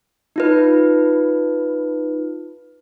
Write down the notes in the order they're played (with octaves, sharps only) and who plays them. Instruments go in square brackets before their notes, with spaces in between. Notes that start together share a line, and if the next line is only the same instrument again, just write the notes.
[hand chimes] D#4 F4 B4